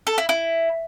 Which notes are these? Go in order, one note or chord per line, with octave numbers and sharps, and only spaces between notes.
A4
E4
E4